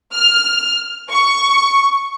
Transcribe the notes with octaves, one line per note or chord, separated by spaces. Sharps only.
F6
C#6